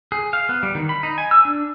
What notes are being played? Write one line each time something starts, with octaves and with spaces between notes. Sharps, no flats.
G#4
F5
B3
G3
D#3
B5
D#4
G#5
E6
D4